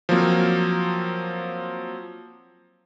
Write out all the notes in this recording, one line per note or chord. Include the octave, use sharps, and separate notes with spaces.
F3 F#3 A#3 C4